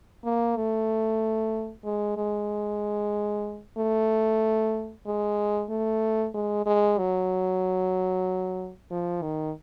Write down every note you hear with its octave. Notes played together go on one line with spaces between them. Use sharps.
A#3
A3
G#3
G#3
A3
G#3
A3
G#3
G#3
F#3
F3
D#3